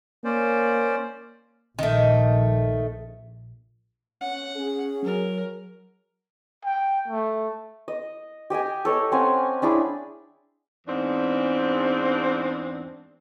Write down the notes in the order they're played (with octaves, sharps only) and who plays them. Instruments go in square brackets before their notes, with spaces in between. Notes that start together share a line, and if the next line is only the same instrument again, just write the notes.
[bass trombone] A#3 [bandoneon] C#4 C5 D5
[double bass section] A#1 [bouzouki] D#3 A3
[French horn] C#4 [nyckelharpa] F#5
[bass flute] C#4 [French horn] G#4
[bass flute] F#3 [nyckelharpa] A#4
[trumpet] G5
A3
[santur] D#5
G4 D#5 G5 G#5
A4 C#5 D#5
C4 C#4 F#5 G#5
C#4 D4 E4 G#4
[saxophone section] E2 G#2 C4 D4